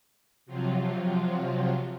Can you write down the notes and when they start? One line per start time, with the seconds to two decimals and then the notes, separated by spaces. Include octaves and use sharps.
0.46 C3 F3 F#3 F4